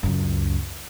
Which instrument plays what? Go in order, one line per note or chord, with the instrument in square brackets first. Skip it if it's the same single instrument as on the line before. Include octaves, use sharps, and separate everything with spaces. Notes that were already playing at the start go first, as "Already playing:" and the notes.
[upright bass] C#2 F#2